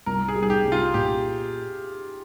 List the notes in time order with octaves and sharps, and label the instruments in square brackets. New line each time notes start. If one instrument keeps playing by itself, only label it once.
[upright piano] C2 [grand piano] A#4
[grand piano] G#4
[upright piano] G3
[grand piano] G#4
G4
[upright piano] C2
[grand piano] F4
[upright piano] A#2 [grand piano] G4